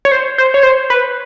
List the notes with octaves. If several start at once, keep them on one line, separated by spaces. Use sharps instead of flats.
C#5
C5
C5
C#5
C5
B4